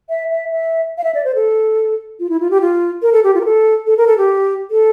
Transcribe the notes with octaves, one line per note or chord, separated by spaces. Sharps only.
E5
E5
E5
F5
E5
D5
C5
A4
F4
E4
F4
G4
F4
A#4
A4
G4
F4
A#4
A4
A4
A#4
A4
G4
A4